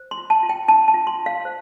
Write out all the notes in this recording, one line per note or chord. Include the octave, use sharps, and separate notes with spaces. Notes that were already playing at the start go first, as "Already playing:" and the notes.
Already playing: C5
C6
F4
A5
F4
G5
D4 A5
A5
F4
C6
F4
F5
C5